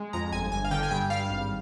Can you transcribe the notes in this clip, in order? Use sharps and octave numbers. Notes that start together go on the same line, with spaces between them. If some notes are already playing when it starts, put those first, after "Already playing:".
Already playing: G#3
F2 A#5
G1 G#5
G1 G#5
F5
D3 G5
G#5
G2 G5
G3 F5
G#1